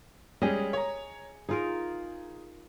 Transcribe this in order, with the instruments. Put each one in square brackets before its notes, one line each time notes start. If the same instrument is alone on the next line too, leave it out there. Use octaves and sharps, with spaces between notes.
[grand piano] G3 G#3 C#4 [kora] G#4 D#5
[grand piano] C#5 A#5
[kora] D#4 F4 A#4 [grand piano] G#4